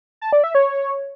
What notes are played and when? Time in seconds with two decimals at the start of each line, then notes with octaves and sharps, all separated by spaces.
0.21 A5
0.33 D5
0.44 E5
0.55 C#5